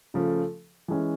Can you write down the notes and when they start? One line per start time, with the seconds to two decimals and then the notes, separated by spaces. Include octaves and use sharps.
0.14 C#3 F3 A3
0.88 E3 G#3 C#4